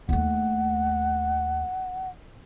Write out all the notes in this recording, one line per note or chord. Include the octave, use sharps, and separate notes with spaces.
D#2 A3 F#5